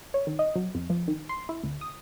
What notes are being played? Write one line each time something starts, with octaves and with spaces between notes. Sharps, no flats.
C#5
D#3
D#5
F#3
F2
F3
D#3
C6
E4
D2
D#6